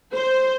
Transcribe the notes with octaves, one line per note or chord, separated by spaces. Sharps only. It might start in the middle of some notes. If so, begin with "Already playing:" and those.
C5